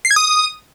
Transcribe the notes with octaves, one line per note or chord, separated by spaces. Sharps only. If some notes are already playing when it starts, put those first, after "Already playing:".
C7
G#6
D#6